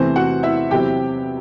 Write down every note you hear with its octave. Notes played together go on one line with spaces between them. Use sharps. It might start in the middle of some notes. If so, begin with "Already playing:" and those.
Already playing: E2 C3 E3 A3 C4 C5
F#4 F#5
E4 E5
E2 C3 F#3 C4 E4 G4 G5